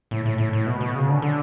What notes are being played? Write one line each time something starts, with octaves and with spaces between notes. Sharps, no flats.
A2
A2
A2
A2
B2
B2
C#3
D3
D3